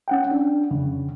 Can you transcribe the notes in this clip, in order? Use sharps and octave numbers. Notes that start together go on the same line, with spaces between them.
C#4 F#5 G5
D4
F2 C#3